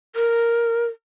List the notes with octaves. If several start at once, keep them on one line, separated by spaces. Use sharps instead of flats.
A#4